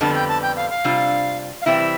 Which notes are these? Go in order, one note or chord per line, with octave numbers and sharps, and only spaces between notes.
F2 D3 G3 B3 A5
G5
A5
G5
F5
F5
C3 G3 D4 F4
F5
C3 E3 G3 C4 E4 E5